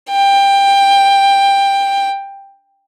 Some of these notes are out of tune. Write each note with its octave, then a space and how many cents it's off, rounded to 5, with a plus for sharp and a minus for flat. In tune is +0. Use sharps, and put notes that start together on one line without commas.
G5 +15